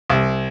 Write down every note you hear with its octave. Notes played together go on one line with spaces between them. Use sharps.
C2